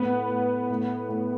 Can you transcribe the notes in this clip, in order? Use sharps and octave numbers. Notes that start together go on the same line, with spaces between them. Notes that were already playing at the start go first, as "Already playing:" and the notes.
Already playing: A2 B3 B4
A2
A2
A2